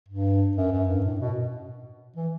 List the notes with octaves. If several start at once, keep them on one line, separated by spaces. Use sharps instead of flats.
G2
F#2
F#2
G2
A2
B2
E3